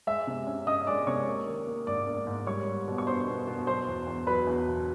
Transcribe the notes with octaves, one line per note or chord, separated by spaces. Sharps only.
G#3 E5 E6
C3
C#4
C#4 D#5 D#6
G#3 D5 D6
C3 C#5 C#6
A#3
D#3
A#3
G#2 D5 D6
A#3
G#2
G3 C#5 C#6
G3
B2
C#6
B3 C5 C6
B2
B2
F#3 C5 C6
E2
E2
F#3 B4 B5
E2
B2